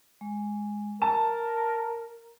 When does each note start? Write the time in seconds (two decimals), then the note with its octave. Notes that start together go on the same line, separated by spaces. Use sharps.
0.21 G#3
1.02 A#4 A5 A#5